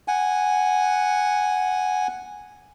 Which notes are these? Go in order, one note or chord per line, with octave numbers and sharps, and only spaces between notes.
F#5 G#5